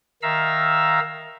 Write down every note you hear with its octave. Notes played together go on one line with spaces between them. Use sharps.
D#3 E5 F5 A#5 E6